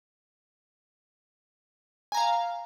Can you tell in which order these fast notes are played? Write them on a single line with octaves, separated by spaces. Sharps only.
G#5 A#5 F5